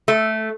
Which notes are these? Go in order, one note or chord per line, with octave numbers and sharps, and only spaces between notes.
A3